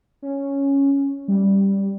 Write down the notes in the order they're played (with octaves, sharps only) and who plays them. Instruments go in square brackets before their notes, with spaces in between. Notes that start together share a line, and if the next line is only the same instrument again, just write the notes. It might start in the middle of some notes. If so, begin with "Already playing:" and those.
[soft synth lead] C#4
G3